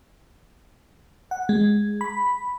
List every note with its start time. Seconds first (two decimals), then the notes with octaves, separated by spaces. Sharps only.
1.31 F#5
1.49 G#3
2.01 B5